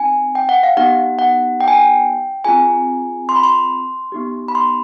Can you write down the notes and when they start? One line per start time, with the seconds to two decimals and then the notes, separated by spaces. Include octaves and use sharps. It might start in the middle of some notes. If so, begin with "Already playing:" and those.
Already playing: C4 D#4 G#5
0.35 G5
0.49 F#5
0.63 F5
0.77 B3 D#4 G4 F#5
1.19 F#5
1.61 G5
1.68 G#5
1.75 G5
2.45 C4 F4 G#4 G#5
3.29 C6
3.36 B5
3.43 C6
4.12 B3 D#4 G4
4.48 B5
4.55 C6